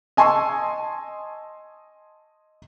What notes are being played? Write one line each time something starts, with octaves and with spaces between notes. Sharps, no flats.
D#5 G#5 A5 C6 C#6 E6